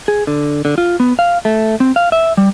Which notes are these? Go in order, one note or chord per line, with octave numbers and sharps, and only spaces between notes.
G#4
D3
D3
F4
B3
F5
A3
C4
F5
E5
G3